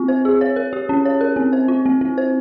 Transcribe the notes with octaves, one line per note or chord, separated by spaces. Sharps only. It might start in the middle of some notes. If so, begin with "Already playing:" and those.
Already playing: C4 F4
C5
G#4
C#5
A#4
G4
C#4
C#5
A#4
C4
C5
F4
C4
C4
C5